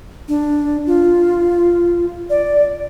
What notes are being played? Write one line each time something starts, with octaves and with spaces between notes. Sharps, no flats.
D4
F4
D5